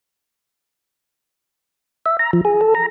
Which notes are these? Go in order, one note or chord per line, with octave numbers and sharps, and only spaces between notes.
E5
A#5
F3
G#4
A4
A#5